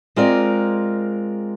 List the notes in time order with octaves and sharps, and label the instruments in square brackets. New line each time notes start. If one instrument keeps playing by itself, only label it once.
[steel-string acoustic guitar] G#3 C4 F4 A#4 D5